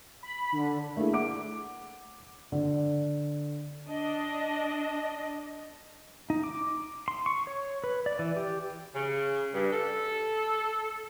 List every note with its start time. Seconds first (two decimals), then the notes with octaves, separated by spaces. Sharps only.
0.23 B5
0.52 D3
0.97 A3 A#3 D4 E4 G#4
1.13 F#5 D6 D7
2.52 D3
3.88 D4 D#5
6.30 D#4
6.43 D6
7.08 C6
7.26 C#6
7.47 C#5
7.84 B4
8.06 D5
8.19 E3
8.37 G4
8.95 C#3
9.54 G2
9.73 A4